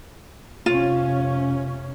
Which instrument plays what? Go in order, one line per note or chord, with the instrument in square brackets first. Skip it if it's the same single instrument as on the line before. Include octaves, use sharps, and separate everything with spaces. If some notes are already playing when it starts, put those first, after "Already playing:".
[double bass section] F1 C3 C#4 [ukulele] F4